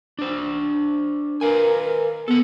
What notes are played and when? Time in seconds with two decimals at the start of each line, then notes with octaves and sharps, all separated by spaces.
0.19 D4 C5
1.41 A#4 B4 F5 G#5
2.28 B3 A4 F#5